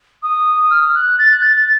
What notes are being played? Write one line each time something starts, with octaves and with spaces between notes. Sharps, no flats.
D#6
F6
F6
F#6
A6
F#6
A6
A6